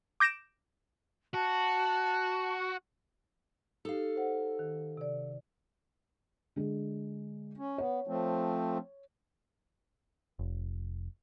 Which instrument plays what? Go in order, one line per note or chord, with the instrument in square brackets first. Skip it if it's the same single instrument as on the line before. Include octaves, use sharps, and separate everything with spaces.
[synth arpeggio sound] D6 G6 A#6 D7 E7
[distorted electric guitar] F#4 [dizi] A5
[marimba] D#4 G4 [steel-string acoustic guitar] A4 F5
[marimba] C5 F#5
D#3
C3 D5
[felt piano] D3 G#3
[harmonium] C#4
[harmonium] B3 [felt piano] C#5
[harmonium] F3 A3 C4
[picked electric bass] F1